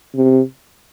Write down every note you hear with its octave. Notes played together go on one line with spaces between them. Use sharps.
C3